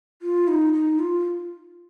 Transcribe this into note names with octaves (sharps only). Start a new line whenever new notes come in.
F4
D#4
D#4
F4